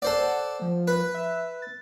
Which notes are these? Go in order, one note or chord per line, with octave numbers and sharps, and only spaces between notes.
A4 C5 D5 F#5
F3
B4
E5
A6